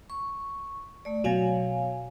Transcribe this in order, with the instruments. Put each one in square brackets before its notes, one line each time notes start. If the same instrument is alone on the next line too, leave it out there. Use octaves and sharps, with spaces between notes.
[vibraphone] C#6
A3 D5
[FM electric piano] B2 F#3 [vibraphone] C#5 F5 G#5